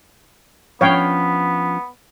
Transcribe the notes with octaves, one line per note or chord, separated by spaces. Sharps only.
F3 B3 C#4 D4 C#5 F5 G5